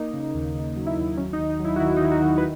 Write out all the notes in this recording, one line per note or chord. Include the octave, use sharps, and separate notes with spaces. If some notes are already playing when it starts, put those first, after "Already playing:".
Already playing: A#3 D#4
C#3
D#2
C#3
F#3
E4
D#2
F#3 C#4
D#4
D#2
D#4
F#3 E4
F#4
D#3 E4
D#4
D#3 E4
F#4
D#3
B4